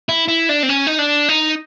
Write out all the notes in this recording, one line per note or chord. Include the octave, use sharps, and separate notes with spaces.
E4
E4
D4
C4
C#4
D#4
D4
D#4